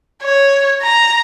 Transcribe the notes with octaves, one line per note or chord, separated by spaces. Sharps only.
C#5
A#5